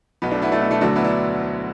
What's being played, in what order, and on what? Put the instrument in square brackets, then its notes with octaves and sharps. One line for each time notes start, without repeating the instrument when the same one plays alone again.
[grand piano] B1 B2 F#3 B3
A3 D4
B3 E4
A3 D4
B3
A3 D4
D2 D3 F#3 D4 F#4
B3 E4
D4